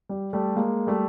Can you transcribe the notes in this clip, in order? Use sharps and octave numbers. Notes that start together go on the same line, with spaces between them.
G3
G3 A3
G#3 A#3
G3 A3